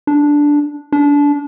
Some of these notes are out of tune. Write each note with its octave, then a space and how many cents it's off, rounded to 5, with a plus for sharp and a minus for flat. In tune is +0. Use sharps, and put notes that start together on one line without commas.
D4 -5
D4 -25